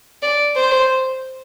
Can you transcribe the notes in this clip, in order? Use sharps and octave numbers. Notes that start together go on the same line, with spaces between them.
D5
C5